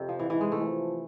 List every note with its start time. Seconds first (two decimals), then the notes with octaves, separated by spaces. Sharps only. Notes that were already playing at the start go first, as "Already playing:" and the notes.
Already playing: F2 C3
0.09 F3
0.19 E3
0.30 G#2 E3
0.41 G#3
0.52 A3
0.64 F3